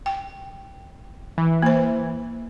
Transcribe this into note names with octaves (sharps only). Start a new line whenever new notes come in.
G5
E3
A#3 C5